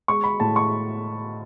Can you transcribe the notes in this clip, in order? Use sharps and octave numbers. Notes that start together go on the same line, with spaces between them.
G#3 C#6
B5
A2 A5
C#6